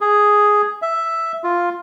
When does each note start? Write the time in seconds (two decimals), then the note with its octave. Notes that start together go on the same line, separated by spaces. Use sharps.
0.01 G#4
0.82 E5
1.44 F4